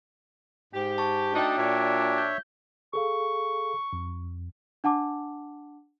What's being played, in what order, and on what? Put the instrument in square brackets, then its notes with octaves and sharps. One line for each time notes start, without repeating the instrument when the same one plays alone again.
[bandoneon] G#2 [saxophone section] G4
[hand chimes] A5 C#6
[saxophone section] A3 D#4 [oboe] D4 [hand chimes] F#4 G5
[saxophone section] A#2 [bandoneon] C#5 E5
[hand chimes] G6
[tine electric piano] G#4 A4 F5 [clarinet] C#6
[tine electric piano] F2
[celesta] D4 F#5 A5 D6